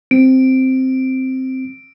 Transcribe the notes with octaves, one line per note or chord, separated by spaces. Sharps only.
C4 D7